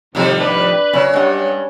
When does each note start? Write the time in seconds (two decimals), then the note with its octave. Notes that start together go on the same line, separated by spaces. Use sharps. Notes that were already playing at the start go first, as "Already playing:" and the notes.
0.15 F2 A2 C3 D#3 F3 G3 G#3
0.40 D4 B4
0.93 C#3 F#3 C#4 C#5
1.14 G2 G#3 F#5